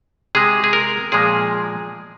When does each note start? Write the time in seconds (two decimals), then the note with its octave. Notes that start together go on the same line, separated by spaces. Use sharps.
0.35 C3 G#3 G#4
0.64 G#4
0.73 A#4
1.12 A#2 F3 G#3 G#4